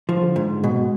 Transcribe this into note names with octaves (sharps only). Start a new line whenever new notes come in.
F3
D3
G#2
B2 G#3